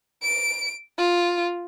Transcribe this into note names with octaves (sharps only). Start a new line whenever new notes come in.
D7
F4